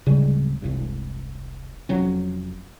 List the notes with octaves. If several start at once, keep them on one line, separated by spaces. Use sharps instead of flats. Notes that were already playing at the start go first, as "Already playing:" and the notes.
D1 C#3 G3 G#3
E1 C2 G2
F1 F2 F#3 C#4